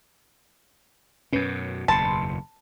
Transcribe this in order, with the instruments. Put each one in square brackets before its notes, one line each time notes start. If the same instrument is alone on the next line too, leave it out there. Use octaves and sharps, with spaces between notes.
[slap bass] F#2 B2 [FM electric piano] C#4 B4
[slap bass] F#1 E2 B2 [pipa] A5 [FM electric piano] B5 C6